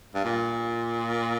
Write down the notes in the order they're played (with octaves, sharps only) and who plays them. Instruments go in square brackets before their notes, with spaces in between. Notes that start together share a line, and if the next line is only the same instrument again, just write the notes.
[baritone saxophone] G2
A#2